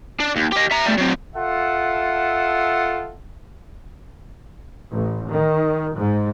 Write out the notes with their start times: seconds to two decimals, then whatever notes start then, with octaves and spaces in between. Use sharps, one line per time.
0.20 D4
0.36 D#2
0.52 G4 D#5
0.71 E5 A#5
0.86 G3 A3
0.98 F#3 C4
1.36 F4 A4 E5 F#5
4.91 A1
5.31 D#3
5.96 G#2